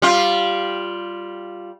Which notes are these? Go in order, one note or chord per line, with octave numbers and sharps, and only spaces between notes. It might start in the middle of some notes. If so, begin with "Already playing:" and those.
G3 F4